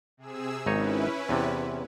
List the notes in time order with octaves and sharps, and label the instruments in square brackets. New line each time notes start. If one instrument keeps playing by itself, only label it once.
[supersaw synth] C3 G#4 E6
[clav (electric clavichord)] G#1 D#4 C#5 [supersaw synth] C#4 E4 B4
[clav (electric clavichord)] E2 C3